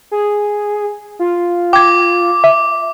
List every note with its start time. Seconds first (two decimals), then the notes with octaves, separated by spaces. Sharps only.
0.11 G#4
1.19 F4
1.73 G5 D6 G#6
2.44 E5